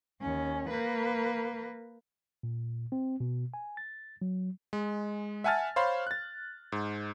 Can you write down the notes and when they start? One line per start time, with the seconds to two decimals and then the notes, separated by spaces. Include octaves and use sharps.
0.22 D#2 C#4
0.69 A#3 B4
2.43 A#2
2.92 C4
3.20 B2
3.54 G#5
3.77 A6
4.22 F#3
4.73 G#3
5.44 E5 F#5 G#5 A5 F6 A6
5.76 C5 C#5 F5 B5 C6
6.07 F#6 A6
6.72 G#2